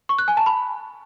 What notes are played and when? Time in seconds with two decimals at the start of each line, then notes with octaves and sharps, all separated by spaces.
0.09 C#6
0.19 F#6
0.28 G#5
0.37 A5
0.46 B5